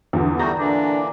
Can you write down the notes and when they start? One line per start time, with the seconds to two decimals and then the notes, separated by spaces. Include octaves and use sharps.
0.13 E2 D3
0.39 G3 A3 F#4 A#5 G6 A#6
0.59 A#2 D3 E3 D4